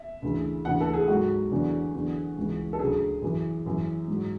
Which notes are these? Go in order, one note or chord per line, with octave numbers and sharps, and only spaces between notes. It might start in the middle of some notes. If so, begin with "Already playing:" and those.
Already playing: E5
D2 C#3 E3
D2 C#3 E3 F#5
A4
G#4
G#2 F#3 F#4
E2 D3 F#3
E2 D3 F#3
C#2 C#3 E3
A4
D2 C#3 F#3 G#4
F#2 E3
F#2 E3
G#2 F#3